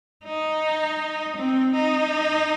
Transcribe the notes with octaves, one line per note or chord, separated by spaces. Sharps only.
D#4
C4
D#4